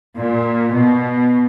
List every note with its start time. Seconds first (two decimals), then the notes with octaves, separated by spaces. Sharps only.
0.17 A#2
0.74 B2